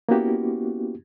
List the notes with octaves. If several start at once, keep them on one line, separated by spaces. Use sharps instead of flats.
A#3 B3 C#4 E4 F#4 G4